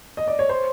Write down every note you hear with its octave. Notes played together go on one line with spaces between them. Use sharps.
D#5
D5
C#5
C5